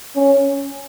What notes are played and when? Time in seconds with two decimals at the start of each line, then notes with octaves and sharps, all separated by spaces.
0.16 C#4